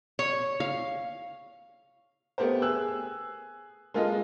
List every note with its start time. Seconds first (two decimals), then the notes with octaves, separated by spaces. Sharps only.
0.19 C#5
0.60 F5
2.38 A3 B3 G4 A#4 C5
2.62 G#4 E6 F#6
3.94 G#3 A#3 F4 A4 D#5